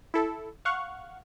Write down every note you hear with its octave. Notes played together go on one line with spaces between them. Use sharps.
E4 A4
F5 F#5 C#6